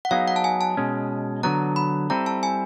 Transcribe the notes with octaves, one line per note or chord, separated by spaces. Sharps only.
F#5
F#3 B3 D#4 G#4 F5
F#5
A5
G#5
A5
B2 G#3 C#4
D3 F#3 B3 A#5
B5
G3 C4 E4 A4 A#5
A5
G#5